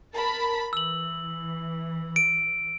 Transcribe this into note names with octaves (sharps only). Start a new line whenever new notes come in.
A#4 A5 B5
E3 E6 F#7
D7